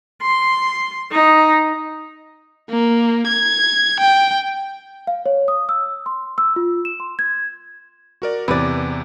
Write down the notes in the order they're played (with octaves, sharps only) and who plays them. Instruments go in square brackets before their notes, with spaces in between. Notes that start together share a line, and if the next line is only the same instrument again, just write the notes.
[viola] C6
D#4
[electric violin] A#3
G#6
G5
[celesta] F5
C#5
D#6
E6
C6
E6
F4
E7
C6
G#6
[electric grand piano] F#4 A#4 D5
[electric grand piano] E2 C3 [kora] B4 D5